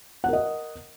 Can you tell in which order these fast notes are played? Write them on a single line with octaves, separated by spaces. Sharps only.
F#5 A#4 D#5